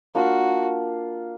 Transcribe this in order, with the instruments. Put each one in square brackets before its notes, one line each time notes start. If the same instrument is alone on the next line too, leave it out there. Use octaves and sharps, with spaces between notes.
[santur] A#3 D4 F4 [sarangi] F#4